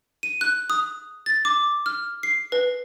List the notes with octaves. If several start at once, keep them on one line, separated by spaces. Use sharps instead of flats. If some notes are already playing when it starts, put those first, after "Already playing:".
D#7
F#6
D#6
A6
D6
F6
C7
B4